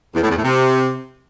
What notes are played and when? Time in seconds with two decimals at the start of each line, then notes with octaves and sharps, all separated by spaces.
0.15 E2
0.22 A2
0.29 E2
0.36 A2
0.44 C3